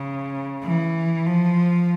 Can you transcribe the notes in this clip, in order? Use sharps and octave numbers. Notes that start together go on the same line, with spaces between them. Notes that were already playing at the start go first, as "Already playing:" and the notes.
Already playing: C#3
E3
F3